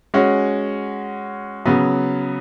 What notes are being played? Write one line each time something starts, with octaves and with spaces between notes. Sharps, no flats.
G#3 C#4 F#4
C#3 F#3 B3